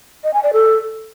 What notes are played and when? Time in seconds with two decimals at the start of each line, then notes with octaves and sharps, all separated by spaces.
0.24 D#5
0.34 G#5
0.43 D5
0.53 A4